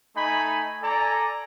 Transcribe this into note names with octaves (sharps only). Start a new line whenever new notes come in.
A3 D#4 G#5 B5
A4 D5 G#5 A#5